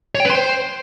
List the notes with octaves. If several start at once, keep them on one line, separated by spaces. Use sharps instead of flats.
C#5
G5
B4
C6
C5